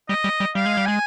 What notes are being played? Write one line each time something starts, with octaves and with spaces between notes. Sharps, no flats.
G3 D#5
G3
G3
G3 F5
G#3
G3
G#3 G#5